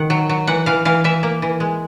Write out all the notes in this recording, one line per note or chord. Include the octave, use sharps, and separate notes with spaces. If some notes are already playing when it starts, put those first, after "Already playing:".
Already playing: D#3 F#5
F#3
F#3
E3 F#5
E3 F5
E3 F5
E3 E5
A#3
E3
G#3